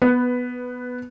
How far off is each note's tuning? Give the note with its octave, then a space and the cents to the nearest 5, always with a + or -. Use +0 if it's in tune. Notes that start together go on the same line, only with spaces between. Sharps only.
B3 +0 B4 +10